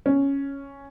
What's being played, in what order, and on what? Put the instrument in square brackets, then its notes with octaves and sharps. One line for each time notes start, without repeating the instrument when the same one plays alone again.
[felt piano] C#4